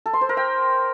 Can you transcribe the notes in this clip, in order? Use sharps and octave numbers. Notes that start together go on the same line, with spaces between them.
A4
C6
C5
A#4
G5